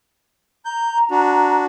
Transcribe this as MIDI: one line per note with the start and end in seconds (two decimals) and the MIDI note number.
0.65 1.62 82
0.65 0.98 91
1.11 1.66 62
1.11 1.66 66